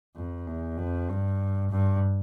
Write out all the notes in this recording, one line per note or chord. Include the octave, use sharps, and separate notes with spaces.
F2
E2
F2
G2
G2